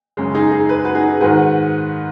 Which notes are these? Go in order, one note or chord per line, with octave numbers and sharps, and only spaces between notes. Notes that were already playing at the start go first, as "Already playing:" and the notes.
F#2 C#3 G#3 C#4
D#4 G#4
D#4 G#4
B4
F#4 B4
D#4 G#4
G#2 D#3 F#4 B4